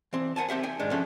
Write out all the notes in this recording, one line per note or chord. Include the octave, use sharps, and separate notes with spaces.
E3 C4
A#4 F#5 G#5 A5
C4 G4 E5 F#5
G5 G#5
G#2 D#3 G#3 D4
F3 C#4 A4 E5 F#5